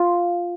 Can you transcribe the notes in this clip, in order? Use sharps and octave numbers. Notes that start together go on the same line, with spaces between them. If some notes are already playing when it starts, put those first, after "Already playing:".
Already playing: F4